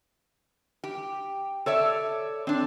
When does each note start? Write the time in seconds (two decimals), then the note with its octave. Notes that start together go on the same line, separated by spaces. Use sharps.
0.84 G4
1.66 A4 C#5 D5 E5
2.47 C4 D4